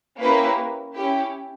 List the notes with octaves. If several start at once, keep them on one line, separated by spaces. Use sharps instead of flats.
A#3 C#4 E4 G4 B4
C#4 E4 G4